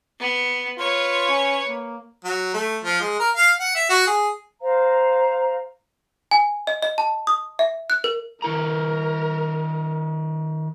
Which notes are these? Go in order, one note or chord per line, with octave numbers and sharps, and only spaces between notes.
B3
F4 B4 C#5
C#4
A#3
F#3
A3
F3
G#3
A#4
F5
F#5
E5
F#4
G#4
C5 F5 A#5
G#5
D#5
D#5
A5
D#6
E5
F#6
A#4
D#3 E4 A#4 A#5